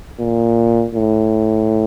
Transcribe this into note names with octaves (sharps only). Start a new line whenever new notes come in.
A#2
A2